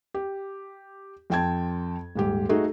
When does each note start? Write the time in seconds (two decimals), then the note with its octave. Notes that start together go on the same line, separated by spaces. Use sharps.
0.14 G4
1.30 F2 C4 G5 A5 G#6
2.15 D#1 G#2 G4
2.49 A3 D#4 F#4 G#4